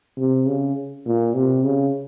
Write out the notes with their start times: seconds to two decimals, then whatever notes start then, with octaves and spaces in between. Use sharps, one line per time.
0.17 C3
0.47 C#3
1.06 A#2
1.34 C3
1.64 C#3